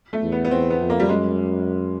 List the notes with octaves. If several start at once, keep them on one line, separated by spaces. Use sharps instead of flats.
A3
E2
B3
B3
E2 C4
B3
F2
A#3
G3
F#2 G#3